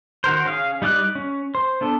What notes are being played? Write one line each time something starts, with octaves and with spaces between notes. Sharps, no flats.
D#3 F#4 A#4 C5
C#4 G#4 F5
G3 D#4 D5 F5 F#6
C#4
C5
B3 D4 A4